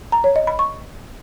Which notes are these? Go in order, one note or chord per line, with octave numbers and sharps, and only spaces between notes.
A#5
C#5
D#5
B5
C#6